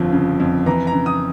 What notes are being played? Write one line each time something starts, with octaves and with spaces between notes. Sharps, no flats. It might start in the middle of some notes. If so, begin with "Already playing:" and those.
Already playing: G1 F2 F3
C#3
F2
E3 A#5
A#5
C#3
D#6